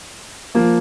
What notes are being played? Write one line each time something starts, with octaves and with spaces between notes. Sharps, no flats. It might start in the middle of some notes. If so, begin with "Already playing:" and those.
F3 A#3